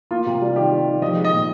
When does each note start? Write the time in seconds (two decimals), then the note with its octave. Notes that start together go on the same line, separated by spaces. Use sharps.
0.11 A#3 F4
0.26 C3
0.42 G3
0.56 D#3 G4
0.72 G3
0.87 D#3
1.02 F3 D#5
1.17 G#3
1.25 D#5
1.32 A#2